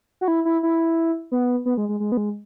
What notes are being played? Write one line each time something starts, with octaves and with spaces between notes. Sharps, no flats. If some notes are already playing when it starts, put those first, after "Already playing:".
F#4
E4
E4
E4
B3
B3
G#3
G#3
G#3
B3
G#3